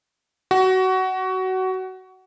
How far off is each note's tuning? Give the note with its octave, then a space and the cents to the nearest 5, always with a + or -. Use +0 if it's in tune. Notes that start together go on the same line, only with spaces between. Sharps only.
F#4 +20